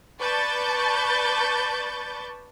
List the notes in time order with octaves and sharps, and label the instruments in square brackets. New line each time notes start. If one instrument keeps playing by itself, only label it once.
[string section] B4 D5 A5 C#6 G6 A6